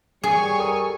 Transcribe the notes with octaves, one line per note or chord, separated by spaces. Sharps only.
G3 G#4 C#5 G#5 C#6
A4 A#4 D#6